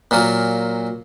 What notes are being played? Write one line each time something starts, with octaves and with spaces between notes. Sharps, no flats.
A#2 F#3 A#3